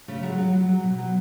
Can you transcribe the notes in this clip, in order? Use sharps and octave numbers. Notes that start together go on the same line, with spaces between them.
C#3 A3
F#3 G#3
F#3
F#3
F#3
B2
F#3